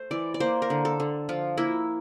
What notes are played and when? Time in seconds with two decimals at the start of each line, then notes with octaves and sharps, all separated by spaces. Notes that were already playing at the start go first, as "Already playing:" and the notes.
Already playing: A3 C5
0.11 E3 D5
0.34 D5
0.40 A#3 C5
0.62 A#4
0.70 D3
0.85 A4
1.00 D3
1.29 F3 F4
1.57 A#3 E4